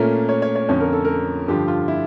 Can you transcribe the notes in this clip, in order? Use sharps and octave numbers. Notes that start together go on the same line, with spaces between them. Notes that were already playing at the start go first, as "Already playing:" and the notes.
Already playing: A#2 A3 C#4 A#4
C#5
C#5
C#5
F2 D3 F3 C#4 C#5
A#4
A4
A#4
G2 D3 F3 G4
F4
E4